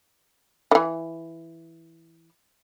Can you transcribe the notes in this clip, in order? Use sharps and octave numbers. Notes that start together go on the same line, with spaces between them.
D#3 E3